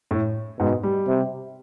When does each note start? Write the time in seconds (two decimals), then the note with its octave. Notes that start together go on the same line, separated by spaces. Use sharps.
0.11 A2 A3
0.60 G#2 B2 G#3
0.83 G3
1.08 C3